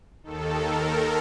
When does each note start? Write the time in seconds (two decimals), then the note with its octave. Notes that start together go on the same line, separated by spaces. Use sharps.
0.23 D#2 D#3 A4
0.62 A#4